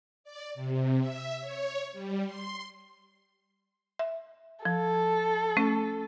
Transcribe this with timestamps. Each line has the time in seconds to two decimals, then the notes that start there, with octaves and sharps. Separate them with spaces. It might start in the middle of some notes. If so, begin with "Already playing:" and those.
0.24 D5
0.54 C3
0.99 E5
1.40 C#5
1.93 G3
2.26 C6
3.99 E5
4.65 F3 A4
5.57 A3 C#4